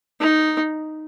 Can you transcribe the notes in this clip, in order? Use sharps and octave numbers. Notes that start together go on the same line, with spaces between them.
D#4